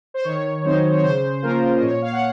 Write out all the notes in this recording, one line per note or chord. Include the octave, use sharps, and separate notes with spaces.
C5
D#3 C#5
F#3 C4 D#4 C5
C#5
C#3 C5
F3 A#3 C#4 F4 A#4
D#5
A#2 C#5
F5
F#5